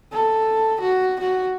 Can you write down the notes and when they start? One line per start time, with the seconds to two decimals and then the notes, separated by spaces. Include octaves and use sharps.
0.12 A4
0.80 F#4
1.20 F#4